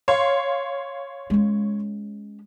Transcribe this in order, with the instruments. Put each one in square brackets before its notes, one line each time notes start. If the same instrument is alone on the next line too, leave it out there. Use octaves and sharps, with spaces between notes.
[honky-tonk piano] C#5 F5 C6
[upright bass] G#3 C#4